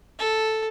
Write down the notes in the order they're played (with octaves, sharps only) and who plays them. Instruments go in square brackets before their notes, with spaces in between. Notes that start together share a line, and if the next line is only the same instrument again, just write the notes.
[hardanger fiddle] A4